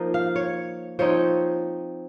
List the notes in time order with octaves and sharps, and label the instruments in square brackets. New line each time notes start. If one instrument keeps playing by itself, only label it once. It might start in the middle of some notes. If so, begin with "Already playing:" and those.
Already playing: [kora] F3 A#3 D#4
F5
C#5
F3 C4 D#4 C#5